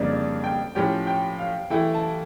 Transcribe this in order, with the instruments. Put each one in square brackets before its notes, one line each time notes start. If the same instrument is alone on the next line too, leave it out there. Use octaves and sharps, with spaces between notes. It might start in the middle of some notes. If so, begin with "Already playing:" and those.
Already playing: [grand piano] F2 C#3 G3 A#3 D4 [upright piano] D5
[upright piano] D5
G5
[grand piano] A2 F3 C#4 G4 [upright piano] G5
[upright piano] G5
F5
[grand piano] E3 A3 E4 [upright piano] G5
[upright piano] A5